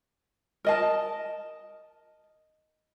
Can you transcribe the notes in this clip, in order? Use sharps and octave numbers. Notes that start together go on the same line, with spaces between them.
A#4 D#5 A5